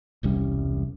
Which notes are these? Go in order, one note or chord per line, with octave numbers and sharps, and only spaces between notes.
E1 C2 G3 C#4